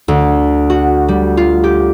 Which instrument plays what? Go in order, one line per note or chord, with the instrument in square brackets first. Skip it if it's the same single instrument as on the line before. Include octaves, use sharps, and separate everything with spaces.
[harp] D2
F#4
G3
F4
G4